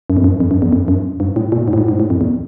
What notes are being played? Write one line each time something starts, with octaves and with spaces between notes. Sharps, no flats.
F#2
F2
F#2
F2
F#2
E2
F2
F#2
G2
A2
A#2
G#2
A2
G#2
G#2
A2
F2
E2